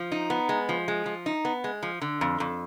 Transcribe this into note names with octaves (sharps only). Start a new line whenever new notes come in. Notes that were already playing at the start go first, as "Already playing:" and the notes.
Already playing: F3
D#4
B3
G#3
F3
G#3
F3
D#4
B3
G#3
F3
D3
F2
F2